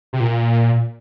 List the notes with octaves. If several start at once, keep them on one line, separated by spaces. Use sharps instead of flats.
C3
A#2